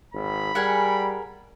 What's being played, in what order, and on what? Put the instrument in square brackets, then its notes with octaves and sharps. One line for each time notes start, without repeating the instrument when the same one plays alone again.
[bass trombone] G#1 [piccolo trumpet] B5
[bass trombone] G3 [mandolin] G#4 A#4 F#5